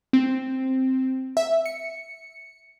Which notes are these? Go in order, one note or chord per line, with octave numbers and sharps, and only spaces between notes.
C4
E5
C#7